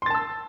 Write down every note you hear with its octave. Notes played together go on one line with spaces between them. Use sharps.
A5 C6 E6 A6